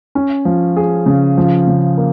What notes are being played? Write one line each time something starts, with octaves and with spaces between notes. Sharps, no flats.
C#4
F3
G#4
C#3
F3
C#3
A#3